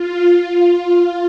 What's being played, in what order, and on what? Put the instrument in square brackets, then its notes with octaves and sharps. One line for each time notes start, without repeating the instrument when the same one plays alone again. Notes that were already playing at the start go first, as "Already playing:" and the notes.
Already playing: [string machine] F4
F4